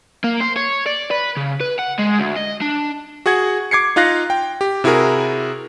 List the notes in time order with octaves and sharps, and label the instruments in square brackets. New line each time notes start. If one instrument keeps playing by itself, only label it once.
[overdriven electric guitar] A#3
C5
C#5
D5
B4
C#3
B4
F#5
G#3
D2
D#5
D4
[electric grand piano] F#4 G#4 F#5 G#6
D6 G#6 C7 C#7
D#4 F4 F5 F#6 A#6
G5
G4
C3 E4 F#4 G#4 A#4